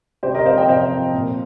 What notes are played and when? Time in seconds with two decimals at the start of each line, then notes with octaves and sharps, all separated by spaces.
0.23 C3 G4 C5
0.34 A#4 D#5
0.46 F3 C4 C5 F5
0.57 D#5 G5
0.68 C3 C5 F5
0.91 F3 C4
1.13 A#2